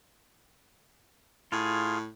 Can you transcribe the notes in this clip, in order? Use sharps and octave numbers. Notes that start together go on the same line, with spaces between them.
A2 F4 G#4